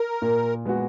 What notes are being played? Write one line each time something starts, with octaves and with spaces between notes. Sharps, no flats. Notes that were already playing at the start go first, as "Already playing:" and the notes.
Already playing: A#4
A#2
G#3 B3 F#4